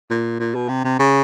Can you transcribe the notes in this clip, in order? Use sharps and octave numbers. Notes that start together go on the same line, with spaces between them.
A#2
A#2
B2
C3
C3
C#3